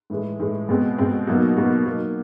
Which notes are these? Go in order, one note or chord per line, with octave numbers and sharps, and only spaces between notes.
A2 E3 G#3
A2 E3 G#3
B2 G#3 C4
B2 G#3 C4
B2 F#3 A#3 D#4 F#4
B2 F#3 A#3 D#4 F#4
F#3 A#3 D#4